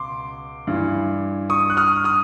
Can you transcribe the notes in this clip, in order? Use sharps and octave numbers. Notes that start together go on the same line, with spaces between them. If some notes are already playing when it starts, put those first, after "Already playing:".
Already playing: C#2 B2 C6 D6
G2 E3
C#6 D#6
F#6
D#6 F6
D#6 F6